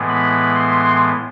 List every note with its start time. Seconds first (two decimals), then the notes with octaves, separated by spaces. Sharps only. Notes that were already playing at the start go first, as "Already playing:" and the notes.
Already playing: A2 E3 G#3 B3
0.09 B5
0.55 C6